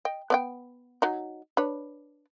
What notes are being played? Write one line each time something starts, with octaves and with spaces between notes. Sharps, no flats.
D#5 G5
B3 D5 G5
F#3 D#4
D4 B4 C#5